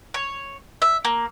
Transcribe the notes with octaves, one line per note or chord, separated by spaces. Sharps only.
C#5
E5
A#3